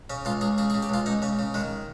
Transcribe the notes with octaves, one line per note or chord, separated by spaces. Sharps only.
C#3 C#4
C#2 F4
C#2 G#4
C#3 G#4
G#4
C#3
G4
C#2 F4
C#2 D#4
C#3 C#4
C#3
D#3 G#3